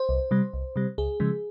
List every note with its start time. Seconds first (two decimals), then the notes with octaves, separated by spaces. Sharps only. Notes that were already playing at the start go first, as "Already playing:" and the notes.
Already playing: C5
0.09 C2
0.31 C3 G3
0.53 C2
0.76 C3 G3
0.98 C#2 G#4
1.20 C#3 F3 G#3